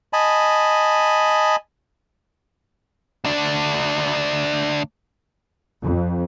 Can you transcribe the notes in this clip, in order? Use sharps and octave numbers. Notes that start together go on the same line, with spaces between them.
D#5 G#5 A5 B5
D2 D4
F2